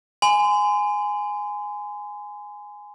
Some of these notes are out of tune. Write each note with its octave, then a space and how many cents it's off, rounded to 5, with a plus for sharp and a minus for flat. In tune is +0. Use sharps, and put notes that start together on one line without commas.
G#5 +0 C6 -35